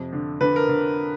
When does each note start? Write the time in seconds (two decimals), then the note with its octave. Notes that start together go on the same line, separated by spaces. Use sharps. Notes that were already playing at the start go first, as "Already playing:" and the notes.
Already playing: F2 C3
0.13 D3
0.41 D3 B4
0.56 A#4
0.69 D3